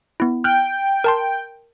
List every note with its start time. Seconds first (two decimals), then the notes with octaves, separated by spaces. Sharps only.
0.20 B3 E4
0.44 G5 F6 F#6
1.04 A#4 A5 C6